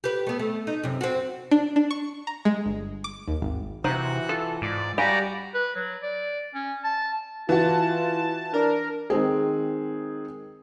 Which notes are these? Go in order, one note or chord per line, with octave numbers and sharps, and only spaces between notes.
G4 B4
A3 B3
A3
D#4
F#2 C3
C4 F#4
D4
D4
C#6
A#5
G#3
G1
D6
D#2
G#1
C3 E3 D#4 F#4 C5 F#5 F#6
F4 A4
G#2 D5
G3 F#4 G4 D5 F5 G#5 A#5 B5
B4
F#3
D5
C#4
A5
E3 F4 F#4 A5
D4 A#4
D#3 G#3 C4 G#4